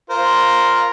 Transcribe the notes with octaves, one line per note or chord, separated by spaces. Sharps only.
F4 A#4 C5